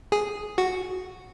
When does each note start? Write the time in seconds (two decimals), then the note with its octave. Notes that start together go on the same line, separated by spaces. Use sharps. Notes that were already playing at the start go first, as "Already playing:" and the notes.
0.12 G#4
0.58 F#4